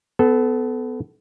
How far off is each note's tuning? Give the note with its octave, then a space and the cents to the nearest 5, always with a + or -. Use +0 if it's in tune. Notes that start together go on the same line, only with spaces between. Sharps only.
B3 +25 A4 -15